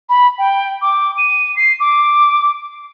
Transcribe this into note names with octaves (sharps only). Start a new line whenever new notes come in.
B5
G5
D6
D#7
C7
D6